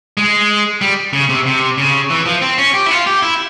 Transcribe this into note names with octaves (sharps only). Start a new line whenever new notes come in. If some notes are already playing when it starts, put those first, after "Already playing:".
G#3
G3
C#3
C3
C3
C#3
E3
F3
C4
C#4
G4
E4
F4
G4
E4